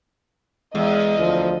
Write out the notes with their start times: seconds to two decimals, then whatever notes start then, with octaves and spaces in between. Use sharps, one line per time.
0.75 E2 G#3 D#5
1.19 D2 F3